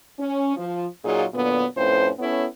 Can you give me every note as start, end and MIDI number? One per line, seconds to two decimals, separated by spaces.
0.19 0.55 61
0.57 0.85 53
1.04 1.24 46
1.04 1.24 54
1.04 1.24 63
1.04 1.24 65
1.04 1.24 68
1.34 1.65 46
1.34 1.65 50
1.34 1.65 54
1.34 1.65 59
1.76 2.10 41
1.76 2.10 45
1.76 2.10 61
1.76 2.10 71
1.76 2.10 72
2.19 2.46 59
2.19 2.46 61
2.19 2.46 64
2.19 2.46 69
2.19 2.46 73